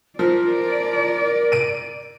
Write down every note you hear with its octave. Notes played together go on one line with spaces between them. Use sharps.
F3 A#4 D5
D7 D#7